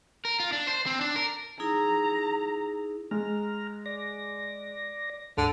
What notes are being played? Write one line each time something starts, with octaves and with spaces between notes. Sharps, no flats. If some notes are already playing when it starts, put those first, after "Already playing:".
A#4
F4
D4
C5
C4
D4
A#4
D#4 E4 G#4 A#5
G#3 A#5 F6
D5 A#6
D2 G#2 D3